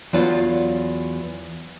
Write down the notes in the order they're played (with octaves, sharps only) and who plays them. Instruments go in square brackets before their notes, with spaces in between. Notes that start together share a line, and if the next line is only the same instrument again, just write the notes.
[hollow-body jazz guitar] E2 F#3 F4